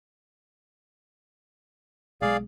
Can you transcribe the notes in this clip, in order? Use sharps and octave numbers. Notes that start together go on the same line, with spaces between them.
B1 G#3 G#4 D5 F5